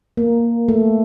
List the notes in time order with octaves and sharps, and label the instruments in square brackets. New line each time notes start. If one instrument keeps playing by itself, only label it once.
[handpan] A#3
A3